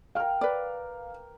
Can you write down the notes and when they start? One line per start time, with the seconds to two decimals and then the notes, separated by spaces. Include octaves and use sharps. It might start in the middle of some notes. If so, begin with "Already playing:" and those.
0.15 A#4 F5 G5 F6
0.41 B4 D5